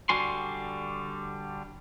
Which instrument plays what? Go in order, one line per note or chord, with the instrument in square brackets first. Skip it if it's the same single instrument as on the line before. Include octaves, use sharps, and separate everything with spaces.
[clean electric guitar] D3 G3 F#4 G#5 C6